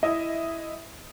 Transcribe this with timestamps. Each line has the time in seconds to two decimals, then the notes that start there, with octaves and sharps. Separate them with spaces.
0.03 E4 D#5 E5 D#6